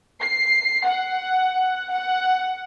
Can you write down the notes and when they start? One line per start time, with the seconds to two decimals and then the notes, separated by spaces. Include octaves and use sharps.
0.22 C7
0.87 F#5
1.92 F#5